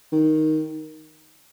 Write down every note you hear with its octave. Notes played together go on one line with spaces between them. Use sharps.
D#3